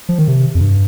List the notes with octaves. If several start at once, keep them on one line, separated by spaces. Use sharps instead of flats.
F3
D#3
C3
F2
G2